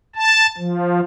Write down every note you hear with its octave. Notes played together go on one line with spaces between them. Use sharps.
A5
F3